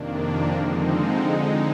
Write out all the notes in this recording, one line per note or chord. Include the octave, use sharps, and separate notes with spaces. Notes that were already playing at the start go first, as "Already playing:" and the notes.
Already playing: F2 C3 D#3 A#3 D4
D3 F3 G#3 C4 D#4
D3 G#3 D#4